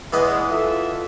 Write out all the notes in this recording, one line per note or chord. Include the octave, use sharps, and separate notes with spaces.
E2 E3 G#3 B3 D#5
F4 A4 E5